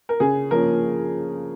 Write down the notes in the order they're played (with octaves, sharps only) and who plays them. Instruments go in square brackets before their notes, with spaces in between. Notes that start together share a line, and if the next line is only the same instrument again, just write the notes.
[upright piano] A#4
C#3 G#4
F3 A#3 C#4 A#4